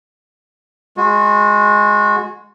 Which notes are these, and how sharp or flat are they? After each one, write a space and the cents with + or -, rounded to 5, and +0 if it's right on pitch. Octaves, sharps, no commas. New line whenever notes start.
G#3 +0 F#4 -30